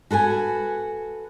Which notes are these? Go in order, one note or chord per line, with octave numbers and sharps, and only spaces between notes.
F#4 A4 B4 G#5